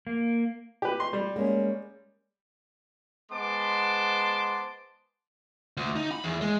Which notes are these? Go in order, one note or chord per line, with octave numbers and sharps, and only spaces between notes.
A#3
G4 B4
C6
G3
G#3 A#3 C#4
G#3 B3 C5 A5 C6 D6
D2
D#4
B5
E2
G#3